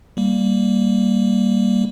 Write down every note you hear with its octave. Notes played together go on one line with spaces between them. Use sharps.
G3 A#3